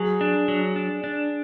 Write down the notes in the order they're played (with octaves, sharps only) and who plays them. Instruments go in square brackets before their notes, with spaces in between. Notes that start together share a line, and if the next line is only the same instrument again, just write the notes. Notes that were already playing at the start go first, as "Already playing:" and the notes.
Already playing: [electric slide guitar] F#3 [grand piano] G#4
[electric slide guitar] D4
F#3
D4
D4